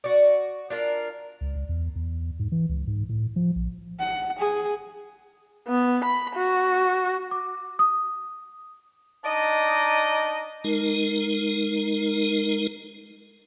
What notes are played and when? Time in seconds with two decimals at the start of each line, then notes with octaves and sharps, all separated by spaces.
0.04 F#4 D5
0.70 D4 F4 A#4
1.41 C#2
1.55 C#2
1.69 E2
1.96 E2
2.39 G#2
2.52 E3
2.69 C#2
2.87 G#2
3.09 A2
3.36 F3
3.56 A#1
4.00 F#5
4.39 G#4
5.68 B3
6.04 B5
6.36 F#4
7.31 D6
7.79 D#6
9.24 D4 D#4 D5 D#5
10.64 G#3 D#4 A#4